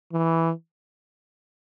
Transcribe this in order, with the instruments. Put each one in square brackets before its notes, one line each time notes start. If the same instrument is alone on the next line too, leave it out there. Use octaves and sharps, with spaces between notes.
[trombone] E3